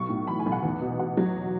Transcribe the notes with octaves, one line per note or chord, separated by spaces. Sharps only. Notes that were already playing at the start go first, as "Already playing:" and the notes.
Already playing: B1 C#6
A2
E3 B5
G#5
B1
F#5
E2
B2
B2 F#5
F#3